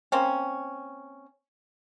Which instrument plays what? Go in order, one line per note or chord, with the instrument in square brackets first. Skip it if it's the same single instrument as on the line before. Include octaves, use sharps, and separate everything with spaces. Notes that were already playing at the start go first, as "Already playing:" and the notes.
[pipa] A#3 C4 C#4